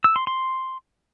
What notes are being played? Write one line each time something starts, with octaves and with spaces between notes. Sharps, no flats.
E6
C6
C6